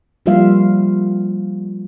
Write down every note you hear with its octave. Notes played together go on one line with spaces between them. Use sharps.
F3 G3 A#3 F4 E5 F5